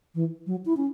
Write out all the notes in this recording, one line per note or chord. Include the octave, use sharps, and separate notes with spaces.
E3
F#3
E4
C#4